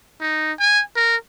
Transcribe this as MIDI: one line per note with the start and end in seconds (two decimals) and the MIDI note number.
0.20 0.52 63
0.59 0.82 80
0.96 1.16 70